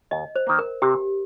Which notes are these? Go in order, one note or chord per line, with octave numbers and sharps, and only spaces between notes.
D#2 D#5
C5
D#3 A#3
A#4
C3 G4